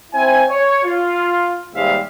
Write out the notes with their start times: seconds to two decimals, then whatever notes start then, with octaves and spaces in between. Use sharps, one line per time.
0.12 C4 E4 C5 G#5
0.48 C#5
0.84 F4
1.74 D#2 G#2 G3 G#3 E5 F5